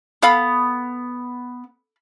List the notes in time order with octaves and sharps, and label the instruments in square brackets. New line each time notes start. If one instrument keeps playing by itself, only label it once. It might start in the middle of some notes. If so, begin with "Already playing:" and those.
[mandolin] B3 [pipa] A4 F5 B5